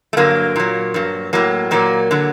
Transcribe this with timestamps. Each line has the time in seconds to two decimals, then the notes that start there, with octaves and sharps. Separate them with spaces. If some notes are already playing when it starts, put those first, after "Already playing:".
0.13 A3
0.17 G2 D3 F#3 A#3
0.56 A#2 F#3
0.94 G2 F#3
1.33 A2 F#3 A#3
1.71 A#2 F#3 A#3
2.11 D3 F#3